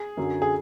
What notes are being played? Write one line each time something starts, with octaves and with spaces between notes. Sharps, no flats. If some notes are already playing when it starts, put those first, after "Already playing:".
Already playing: G#4
F#2 D3 F#3
G#4